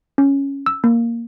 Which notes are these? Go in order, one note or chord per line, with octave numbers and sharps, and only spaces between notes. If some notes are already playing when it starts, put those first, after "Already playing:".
C#4
E6
A#3